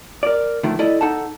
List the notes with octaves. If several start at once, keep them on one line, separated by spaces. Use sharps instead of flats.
A#4 D5
A2 D3 D#3 F3 A3
E4 A4 D5 D#5
D#4 A4 F#5 A5